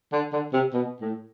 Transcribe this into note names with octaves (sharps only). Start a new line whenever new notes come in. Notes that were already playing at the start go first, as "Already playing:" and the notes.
D3
D3
C3
B2
A2